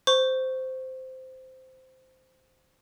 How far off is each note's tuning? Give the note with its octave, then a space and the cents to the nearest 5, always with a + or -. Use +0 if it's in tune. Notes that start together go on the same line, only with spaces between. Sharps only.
C5 -10 C#6 +0